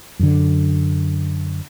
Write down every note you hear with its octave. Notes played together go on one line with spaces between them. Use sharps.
F#2 D3